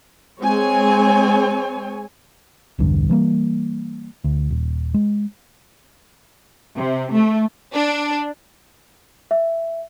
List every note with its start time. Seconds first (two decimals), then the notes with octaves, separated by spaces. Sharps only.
0.41 G#3 C4 C#5 G#5
2.79 B1 E2 G2 D3
3.09 E3 G3 A#3
4.24 D2
4.51 D#1
4.94 G#3
6.76 C3
7.11 A3
7.72 D4
9.31 E5